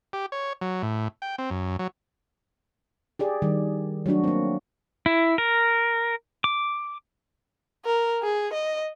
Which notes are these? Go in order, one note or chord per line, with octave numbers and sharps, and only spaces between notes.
G4
C#5
F#3
A2
G5
C4
F#2
F#3
G4 G#4 D5
D#3 G3
F#3 A3 D4 F#4
A#3 C4
E4
A#4
D6
A#4
G#4
D#5